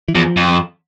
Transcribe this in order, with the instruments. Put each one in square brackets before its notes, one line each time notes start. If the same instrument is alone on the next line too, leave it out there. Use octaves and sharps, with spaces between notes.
[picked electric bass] E3
[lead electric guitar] E2 [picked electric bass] F3
[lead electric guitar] F2